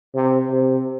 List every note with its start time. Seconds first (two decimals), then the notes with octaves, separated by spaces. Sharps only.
0.15 C3
0.51 C3